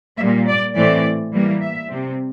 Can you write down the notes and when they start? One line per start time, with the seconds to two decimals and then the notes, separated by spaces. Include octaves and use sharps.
0.19 A#2 G3 A#3 E5
0.47 D5
0.75 A2 E3 A3 C4 D5
1.32 E3 G3 A#3
1.61 E5
1.89 C3 G3 C4